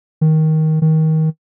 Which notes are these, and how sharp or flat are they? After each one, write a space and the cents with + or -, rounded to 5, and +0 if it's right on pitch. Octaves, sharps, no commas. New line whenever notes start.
D#3 +15
D#3 +25